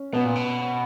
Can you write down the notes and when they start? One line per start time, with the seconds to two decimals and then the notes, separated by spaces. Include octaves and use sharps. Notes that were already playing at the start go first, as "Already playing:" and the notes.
Already playing: C#4
0.13 B2 B3
0.24 A#2
0.35 B2